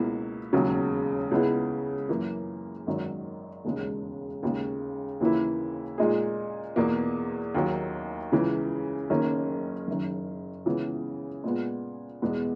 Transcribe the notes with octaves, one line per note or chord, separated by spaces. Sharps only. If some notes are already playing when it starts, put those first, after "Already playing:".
Already playing: C#2 B2 A#3 E4
E1 D#2 C#3 F#3
C#2 C#3 G#3 B3 E4
F#2 E3 A#3
G#1 F#2 D#3 F#3
E1 D#2 C#3 G#3
D#2 C#3 G#3
D#2 C#3 E3 A#3 E4
A#2 G#3 D#4 G#4
E2 B2 A#3
D#2 D#3 F#3
C#2 C#3 E3
F#1 F#2 D#3 A#3 C#4
F#1 F#2 D#3
C#2 C#3 E3 B3
A#2 G#3 B3
E2 B2 G#3 B3